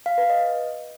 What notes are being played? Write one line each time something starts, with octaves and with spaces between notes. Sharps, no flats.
F5
B4
D#5